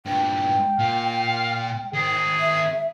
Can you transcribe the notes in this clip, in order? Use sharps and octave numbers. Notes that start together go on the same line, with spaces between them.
G2 A#2 G5
A#2 F5
D#3 C4 G#4
E5